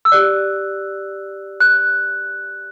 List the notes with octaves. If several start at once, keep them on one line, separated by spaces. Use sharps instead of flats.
E6
G4 D5 F#6
F#6